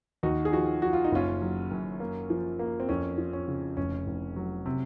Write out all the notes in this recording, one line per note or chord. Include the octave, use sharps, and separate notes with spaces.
D#2 D#4 F#4
G#4
F3 D#4 F#4
F3 F#4
F4
D#4
F#1 C#4 F4
F#3
F#2
A#3
F3
A#3
C4
F2 C#4
F3
C#4
C#3
F1 C#4
F1
F#3
C3